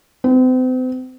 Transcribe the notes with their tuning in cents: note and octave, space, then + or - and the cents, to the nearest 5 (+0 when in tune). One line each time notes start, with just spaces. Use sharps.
C4 -40